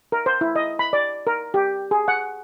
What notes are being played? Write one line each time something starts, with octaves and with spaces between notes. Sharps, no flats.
A#4
C5
E4
D#5
B5
D5
A#4
G4
G#4
F#5